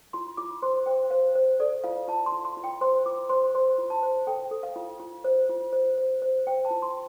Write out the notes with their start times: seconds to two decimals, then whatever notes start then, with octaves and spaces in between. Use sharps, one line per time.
0.13 F4 C6
0.37 F4 D6
0.62 C5 C6
0.86 C5 G5
1.10 C5 F5
1.35 C5
1.60 A4 D5
1.84 F4 F5
2.08 F4 A5
2.26 C6
2.32 F4
2.45 C6
2.57 F4
2.64 G5
2.81 C5 C6
3.06 F4 D6
3.29 C5 C6
3.55 C5 C6
3.78 F4
3.90 A5
4.03 C5
4.27 A4 G5
4.51 A4
4.63 F5
4.76 F4
5.00 F4
5.24 C5
5.50 F4
5.73 C5
5.98 C5
6.22 C5
6.47 C5 G5
6.65 A5
6.71 F4
6.82 C6